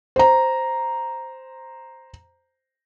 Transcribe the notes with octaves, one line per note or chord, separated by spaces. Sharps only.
C5 A#5